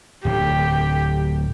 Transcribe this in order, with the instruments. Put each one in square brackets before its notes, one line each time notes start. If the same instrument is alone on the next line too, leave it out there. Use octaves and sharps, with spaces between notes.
[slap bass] D1 D2 A2 [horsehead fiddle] G4